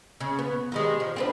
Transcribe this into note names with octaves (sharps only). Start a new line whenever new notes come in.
C#3
B3
D#3 G3 G#3
F3
C4 D4 B4